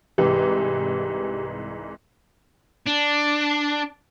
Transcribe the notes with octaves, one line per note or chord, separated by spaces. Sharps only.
C2 G#2 E3 G4
D4